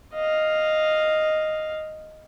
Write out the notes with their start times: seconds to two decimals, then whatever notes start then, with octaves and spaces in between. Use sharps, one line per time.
0.13 D#5 F5